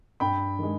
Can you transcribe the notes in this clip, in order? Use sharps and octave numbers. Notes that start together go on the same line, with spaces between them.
G2 G5 B5
D#3 G#3